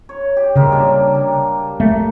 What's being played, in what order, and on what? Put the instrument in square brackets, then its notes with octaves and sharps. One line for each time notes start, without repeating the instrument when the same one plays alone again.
[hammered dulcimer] C#5
G4
[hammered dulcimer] G#2 G3 A#3 [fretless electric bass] C#3
[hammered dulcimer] F#3 G3 D4
G3
[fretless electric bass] A3